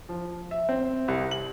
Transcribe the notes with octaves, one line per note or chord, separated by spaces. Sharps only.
F3
E5
C4
C2
F#7